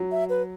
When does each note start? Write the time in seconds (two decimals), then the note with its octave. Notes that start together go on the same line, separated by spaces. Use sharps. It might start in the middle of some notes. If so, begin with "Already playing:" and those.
Already playing: F#3
0.11 E5
0.29 B4